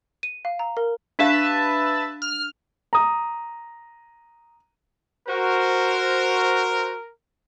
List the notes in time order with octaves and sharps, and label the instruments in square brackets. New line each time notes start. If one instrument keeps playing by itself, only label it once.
[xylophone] D#7
F5
A#5
A#4
[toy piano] D4 G4 F5 [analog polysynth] B4 E5 A5
[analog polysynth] F6
[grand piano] A#5 D#6
[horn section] F#4 C5 [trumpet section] A#4